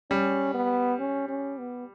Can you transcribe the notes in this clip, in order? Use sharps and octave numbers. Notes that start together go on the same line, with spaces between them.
G3 C#4
B3
C#4
C#4
B3